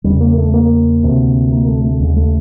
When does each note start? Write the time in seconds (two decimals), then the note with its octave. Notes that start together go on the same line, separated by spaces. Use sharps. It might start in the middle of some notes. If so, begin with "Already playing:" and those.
0.04 E2 C#3 G3
0.21 A#3
0.37 A3
0.54 A#3
1.03 D2 C3
1.52 A#3
1.68 A3
1.85 A3
2.00 D#2 C#3 G#3
2.17 A3